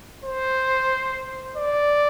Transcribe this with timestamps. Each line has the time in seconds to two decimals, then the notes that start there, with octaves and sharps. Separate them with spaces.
0.24 C5
1.56 D5